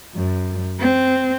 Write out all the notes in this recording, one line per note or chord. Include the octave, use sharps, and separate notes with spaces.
F#2
C4